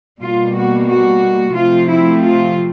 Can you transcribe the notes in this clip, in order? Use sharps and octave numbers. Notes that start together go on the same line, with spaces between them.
B2 G3 A#3 F4
F#4
F#4
C3 F3 A3 C4 F4
E4
F4